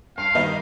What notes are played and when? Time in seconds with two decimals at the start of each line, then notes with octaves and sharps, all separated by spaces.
0.17 G2 F5
0.35 D#3 G3 A#3 D#4